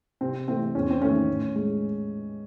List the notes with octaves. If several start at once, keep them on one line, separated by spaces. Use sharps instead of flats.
C3 C4
E3 A3 C4
E2 C#4
C4
D#3 A3 C#4
A2
G#3